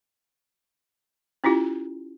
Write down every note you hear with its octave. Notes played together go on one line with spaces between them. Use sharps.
C#4 E4 F4 G4